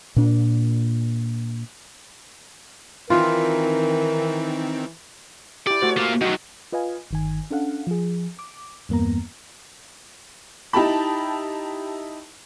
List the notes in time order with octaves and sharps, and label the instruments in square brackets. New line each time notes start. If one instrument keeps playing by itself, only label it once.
[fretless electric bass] A#2 D4
[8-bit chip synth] D#3 C4 D#4 [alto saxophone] E3 [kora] F4 [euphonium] A#4
[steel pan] E4 G4 [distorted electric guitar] D5
[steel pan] A3 F#4 C5
[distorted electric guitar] A#3 F4
[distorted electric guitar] D#3 F#3 [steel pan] D#4 F#4
[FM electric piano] F4 B4 D#5 F5 G#5
G1 D#3 G#5
C#4 D4 A4 F5 F#5
F3 G#4
D6
E2 G2 A#3 B3 A#5
[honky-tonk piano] D#4 E4 G4 A5 B5